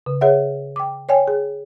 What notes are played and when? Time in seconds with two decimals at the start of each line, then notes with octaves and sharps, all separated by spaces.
0.06 C#3
0.21 G#4 C#5 E5 F#5
0.76 G5 D6
1.09 C#5 D5 G5 G#5
1.28 G#4